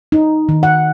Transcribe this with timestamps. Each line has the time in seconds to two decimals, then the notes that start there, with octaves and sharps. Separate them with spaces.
0.12 D#4
0.49 D#3
0.63 F#5